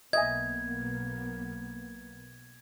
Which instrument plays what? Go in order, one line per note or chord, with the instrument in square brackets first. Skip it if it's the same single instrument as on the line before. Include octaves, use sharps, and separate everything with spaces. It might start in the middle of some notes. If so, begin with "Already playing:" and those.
[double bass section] B1 A#3 B3 [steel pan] D#5 E5 G#5 [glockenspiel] G#6